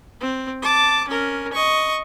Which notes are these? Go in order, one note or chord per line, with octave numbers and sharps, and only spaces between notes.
C4
A5 D6
C#4 A#4
D#5 C#6